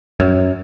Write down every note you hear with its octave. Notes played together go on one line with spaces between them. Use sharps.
F#2